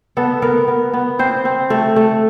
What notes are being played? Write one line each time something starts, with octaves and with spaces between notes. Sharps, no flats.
B3 A4
B3 A#4
B3
B3
C4 C5
C4
A3
A3